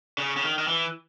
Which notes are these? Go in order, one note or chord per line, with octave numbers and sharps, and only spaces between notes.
C#3
C#3
D#3
D#3
E3